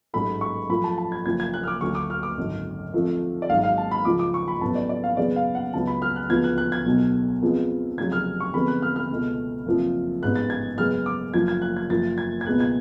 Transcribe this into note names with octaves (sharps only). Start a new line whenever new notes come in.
A1 G#2 F#3 A3 B5
C#6
F#2 F3 A3 B5
A5
A5
G#6
F#1 F#2 F3 G#6
G#6
F#6
F6
D6
D2 D3 F#3 C#6
D6
F6
D6
G#1 F#2 D3
F2 F3 A3
D5
G#1 G#2 F#3 F5
F5
A5
B5
C#2 C#3 F3 D6
D6
C#6
B5
A1 A2 F#3 B3 A5
D5
D5
F5
F#2 C#3 G#3 B3 D5
F5
F#5
C#2 C#3 F#3 B3 A5
B5
F6
F#6
D2 C#3 F3 B3 G#6
F#6
F#6
G#6
B1 B2 F#3 A3
F2 F3 G#3 B3
F1 F2 C#3 F#3 G#6
F6
C#6
F2 D3 G#3 B3 B5
F#6
F6
F6
C#2 B2 A3
F#1 F2 F3
A1 G#2 G#3 B3 F#6
A6
G#6
F#2 C#3 G#3 B3 F6
D6
F#1 F#2 F3 G#6
G#6
F#6
G#6
F#1 F#2 F3 A6
G#6
G#6
C#2 B2 G#3 B3 F#6
G#6